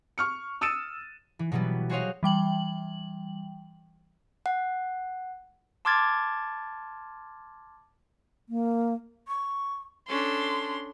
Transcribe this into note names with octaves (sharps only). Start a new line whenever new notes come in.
C#6 F6 C#7
D#6 E6 A6 C#7 D#7 E7
E3
B2 E3 F#3 G3 B3
F#4 G#4 C5 C#5 D#5 F5
E3 G3 G5 F#7
F#5
A5 C6 D6 F6 G#6 A6
A#3
C#6
C#4 D4 A4 C6